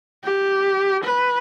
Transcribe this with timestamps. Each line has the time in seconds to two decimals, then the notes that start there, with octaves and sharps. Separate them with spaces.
0.24 G4
1.04 B4